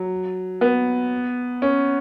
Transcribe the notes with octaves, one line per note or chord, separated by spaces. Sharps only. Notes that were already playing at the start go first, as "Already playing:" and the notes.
Already playing: F#3
B3
C#4